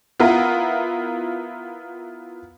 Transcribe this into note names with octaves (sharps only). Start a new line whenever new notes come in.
B3 E4 F4 A#4